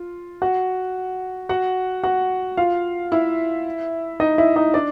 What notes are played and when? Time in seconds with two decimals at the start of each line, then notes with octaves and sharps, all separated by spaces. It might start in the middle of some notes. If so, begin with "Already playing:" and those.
Already playing: F4
0.42 F#4 F#5
1.49 F#4 F#5
2.04 F#4 F#5
2.57 F4 F5
3.12 E4 E5
4.20 D#4 D#5
4.38 E4 E5
4.56 D#4 D#5
4.74 D4 D5